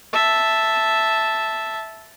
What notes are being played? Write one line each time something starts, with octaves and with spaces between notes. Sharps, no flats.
E5 A5